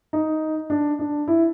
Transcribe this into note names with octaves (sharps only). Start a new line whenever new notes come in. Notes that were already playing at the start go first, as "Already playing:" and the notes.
D#4
D4
D4
E4